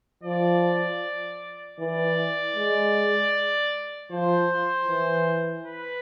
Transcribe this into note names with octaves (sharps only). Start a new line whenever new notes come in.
F3 D5
E3 D5
G#3
F3 C5
E3
B4